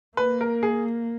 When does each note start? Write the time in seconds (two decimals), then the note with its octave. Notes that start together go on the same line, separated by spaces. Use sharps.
0.17 A#3 B4
0.41 A#4
0.63 G#4